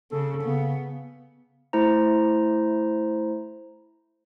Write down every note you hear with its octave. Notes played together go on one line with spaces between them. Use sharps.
C#3 A4
C#3 B3
A3 E4 C5 A#5